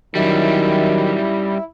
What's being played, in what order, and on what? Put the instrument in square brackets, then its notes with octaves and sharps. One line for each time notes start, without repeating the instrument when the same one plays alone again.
[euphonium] D#3 [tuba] F#3 [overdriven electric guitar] G3 C#4 [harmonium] E4